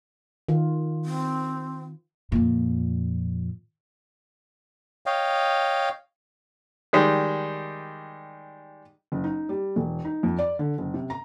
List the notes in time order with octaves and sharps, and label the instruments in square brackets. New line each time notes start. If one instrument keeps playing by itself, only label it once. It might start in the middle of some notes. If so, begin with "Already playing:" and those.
[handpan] D#3 F4
[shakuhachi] C4
[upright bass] F2 A#2
[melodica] C#5 D#5 F5 G5
[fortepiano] D#3 G3 G#3
[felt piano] F#1
D#4
G3
E1
D#4
F2
D5
D3
F#1
C3
A#5